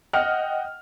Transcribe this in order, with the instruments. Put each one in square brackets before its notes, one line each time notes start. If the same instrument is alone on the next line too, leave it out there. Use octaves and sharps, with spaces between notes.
[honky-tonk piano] D#5 F#5 G5 F6